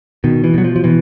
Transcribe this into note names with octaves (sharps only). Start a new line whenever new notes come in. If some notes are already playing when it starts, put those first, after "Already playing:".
B2 D#3
E3
B2 F#3
F3
F3
B2 E3